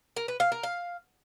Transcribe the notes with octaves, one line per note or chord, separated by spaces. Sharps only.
A#4
B4
F5
A#4
F5